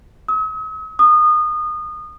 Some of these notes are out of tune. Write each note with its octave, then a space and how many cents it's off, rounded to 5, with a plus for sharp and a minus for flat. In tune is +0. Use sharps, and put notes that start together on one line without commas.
D#6 +45
D#6 -25